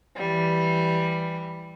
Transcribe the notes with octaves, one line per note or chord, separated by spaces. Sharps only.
E3 G3